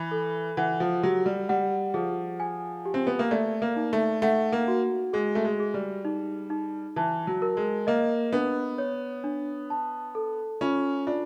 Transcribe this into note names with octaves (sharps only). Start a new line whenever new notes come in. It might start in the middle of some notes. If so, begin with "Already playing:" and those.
Already playing: E3 B5
A4
E3 F#5
F3
F#3 G4
G3
G3 F#5
F3 G#4
G#5
G4
C4
B3
A#3
A3 D5
A#3
D#4
A3
A3 F#5
A#3
F#4
G#3 G#4
A3
G#3
G#4
G3
D#4
D#4
E3 A5
F#3
A#4
G#3
A#3 D#5
B3 D4
C#5
D4
A5
A4
C#4 F4
D4 F4